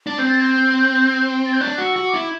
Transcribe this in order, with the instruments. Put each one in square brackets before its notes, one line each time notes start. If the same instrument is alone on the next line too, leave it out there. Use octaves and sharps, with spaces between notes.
[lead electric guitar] D4
[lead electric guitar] C4 [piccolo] G6
[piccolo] A6
G6
A6
G6
[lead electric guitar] D4 [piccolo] F#6
[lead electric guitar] F#4
[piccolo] E6
[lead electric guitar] F#4
[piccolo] D6
[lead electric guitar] E4